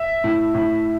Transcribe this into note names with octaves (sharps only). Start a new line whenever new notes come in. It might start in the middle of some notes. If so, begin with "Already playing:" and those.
Already playing: E5
A2
A2